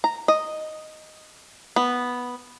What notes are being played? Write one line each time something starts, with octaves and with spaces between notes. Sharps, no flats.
A#5
D#5
B3